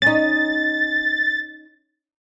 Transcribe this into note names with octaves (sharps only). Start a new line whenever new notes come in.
C#4 D#4 A6